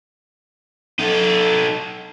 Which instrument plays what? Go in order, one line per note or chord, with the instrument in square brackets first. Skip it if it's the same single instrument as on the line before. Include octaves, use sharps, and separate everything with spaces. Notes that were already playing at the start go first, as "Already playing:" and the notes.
[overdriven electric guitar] D#4 A4